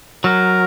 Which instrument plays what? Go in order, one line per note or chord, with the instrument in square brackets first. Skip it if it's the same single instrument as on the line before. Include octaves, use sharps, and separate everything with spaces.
[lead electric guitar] F#3 [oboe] A#4